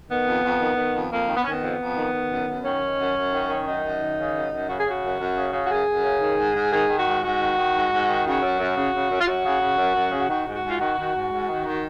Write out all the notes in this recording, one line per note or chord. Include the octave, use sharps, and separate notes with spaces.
D#3 B3
F2
F2
D#3
D#3
F2
F2 A#3
D#3
B3
D#3 C#4
B3
F2
F2
D#3
D#3
F#2
F#2
D#3 C#4
D#3
F#2
F#2
D#3
D#3
F#2 D#4
F#2
D#3
C#3
F#2
F#2
C#3 F#4
G#4
C#3 F#4
F#2
F#2
C#3
C#3
F#4
F#2 G#4
F#2
C#3
D#3
G#2
G#2
D#3 G#4
D#3
F#4
G#2
G#2 F#4
D#3
D#3
G#2
G#2
D#3
C#3 F#4
F#2
F#2
C#3
C#3
F#2
F4
F#2 F#4
C#3
C#3
F#2
F#2
C#3
D#3 F#4
G#2
F#4
G#2
F4
D#3 F#4
D#3
G#2
G#2
D#3
D#3